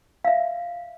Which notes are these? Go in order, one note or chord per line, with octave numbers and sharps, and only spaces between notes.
E5 F5